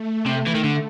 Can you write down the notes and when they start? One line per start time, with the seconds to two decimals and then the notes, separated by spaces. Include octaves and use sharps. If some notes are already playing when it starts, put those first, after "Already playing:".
Already playing: A3
0.26 C3
0.47 E3
0.55 D#3
0.64 D3